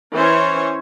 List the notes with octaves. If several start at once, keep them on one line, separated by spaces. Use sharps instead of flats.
E3 C#4 C5 C#5